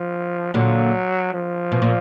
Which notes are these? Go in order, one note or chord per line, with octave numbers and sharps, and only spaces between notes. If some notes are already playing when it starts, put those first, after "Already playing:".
Already playing: F3
A#2 D3 F#3
F3
B2
A#2